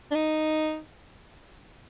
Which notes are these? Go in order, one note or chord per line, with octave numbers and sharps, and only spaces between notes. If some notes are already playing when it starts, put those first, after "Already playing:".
D4
D#4